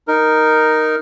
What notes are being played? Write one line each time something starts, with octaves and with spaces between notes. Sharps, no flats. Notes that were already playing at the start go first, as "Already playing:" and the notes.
D#4 A#4